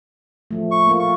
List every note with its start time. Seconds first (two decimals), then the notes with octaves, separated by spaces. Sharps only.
0.51 F3 A3
0.71 C#6
0.87 A#3 F4
1.00 C#6